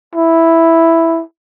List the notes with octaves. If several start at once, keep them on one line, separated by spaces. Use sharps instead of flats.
E4